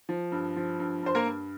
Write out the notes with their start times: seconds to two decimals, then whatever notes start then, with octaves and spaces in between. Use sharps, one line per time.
0.09 F3
0.32 G2
0.56 F3
0.80 G2
1.03 G2 C5
1.15 A#3 A#4
1.26 G2